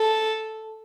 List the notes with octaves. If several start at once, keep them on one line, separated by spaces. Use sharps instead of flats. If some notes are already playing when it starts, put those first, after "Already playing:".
Already playing: A4